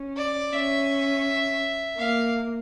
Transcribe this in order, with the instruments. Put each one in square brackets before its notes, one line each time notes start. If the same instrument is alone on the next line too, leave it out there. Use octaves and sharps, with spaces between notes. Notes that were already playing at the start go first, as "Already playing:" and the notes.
Already playing: [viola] C#4
[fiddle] D5
[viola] C#4 [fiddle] E5
[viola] A#3 [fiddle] F5